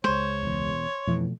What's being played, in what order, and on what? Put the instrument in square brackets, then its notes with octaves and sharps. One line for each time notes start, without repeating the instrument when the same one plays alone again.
[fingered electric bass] C#2 G#3 [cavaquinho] C5 [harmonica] C#5
[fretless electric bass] E1 E2
[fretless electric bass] F2 E3 [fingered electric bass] B2 F3 A3